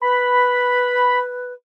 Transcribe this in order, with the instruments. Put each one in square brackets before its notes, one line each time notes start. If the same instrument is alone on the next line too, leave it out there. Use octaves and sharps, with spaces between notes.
[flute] B4 [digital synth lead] B5